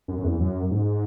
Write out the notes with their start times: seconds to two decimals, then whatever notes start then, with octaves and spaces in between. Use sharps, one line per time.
0.08 F#2
0.19 F#2
0.24 E2
0.40 F#2
0.71 G#2